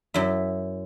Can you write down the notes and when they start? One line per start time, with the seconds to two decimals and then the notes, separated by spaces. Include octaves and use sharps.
0.14 F#2 E4